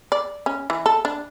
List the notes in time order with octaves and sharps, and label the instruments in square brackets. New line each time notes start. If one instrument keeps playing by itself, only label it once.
[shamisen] D5
C#4
E3
A4
D4